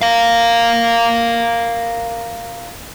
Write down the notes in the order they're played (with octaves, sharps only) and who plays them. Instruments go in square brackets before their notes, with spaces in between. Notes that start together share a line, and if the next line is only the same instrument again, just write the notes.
[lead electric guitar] A#4 F5